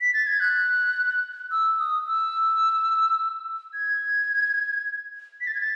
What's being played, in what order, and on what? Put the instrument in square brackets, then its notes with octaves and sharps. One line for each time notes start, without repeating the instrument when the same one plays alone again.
[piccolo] B6
A6
G#6
F#6
E6
D#6
E6
G#6
B6
A6
G#6
A6